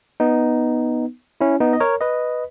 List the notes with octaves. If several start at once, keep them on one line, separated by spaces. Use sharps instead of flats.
B3 D#4
C#4 E4
B3 D#4
D#5
A#4 C#5
B4 D#5